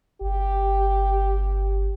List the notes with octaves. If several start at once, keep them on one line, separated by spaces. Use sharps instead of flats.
G1 G4